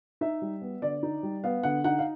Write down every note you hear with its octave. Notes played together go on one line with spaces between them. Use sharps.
D#4 E5
G3
B3
D3 D5
D#4
G3
B3 F5
D3 F#5
D#4 F#5
F5